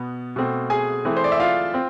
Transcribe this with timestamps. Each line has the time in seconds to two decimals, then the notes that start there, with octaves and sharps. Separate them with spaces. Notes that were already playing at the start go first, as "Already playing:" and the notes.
Already playing: B2 B3
0.36 B2 A3 C4
0.70 G#4 G#5
1.05 E3 A3 C4
1.17 C5
1.24 D5
1.32 E5
1.40 F4 F5
1.74 C4